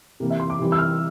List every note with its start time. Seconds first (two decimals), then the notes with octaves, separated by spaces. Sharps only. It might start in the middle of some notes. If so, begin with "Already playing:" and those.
0.20 C3 E3 A#3
0.30 E5
0.40 C6
0.50 D6
0.59 C3 E3 G3
0.72 E6
0.78 F6